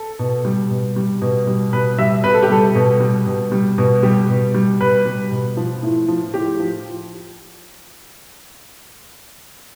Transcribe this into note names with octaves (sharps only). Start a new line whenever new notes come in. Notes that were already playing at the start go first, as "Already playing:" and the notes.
Already playing: A4
B2
G3
B2
G3
B2
G3
B2 B4
G3 E5
B2 B4
A4
G4
G3 A4
B2
G3
B2
G3
B2
G3 G4
B2
G3
B2 B4
G3
B2
F3
A2
F3
A2 G4
F3